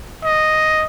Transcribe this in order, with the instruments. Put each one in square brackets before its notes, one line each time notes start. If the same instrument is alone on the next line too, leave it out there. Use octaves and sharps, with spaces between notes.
[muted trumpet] D#5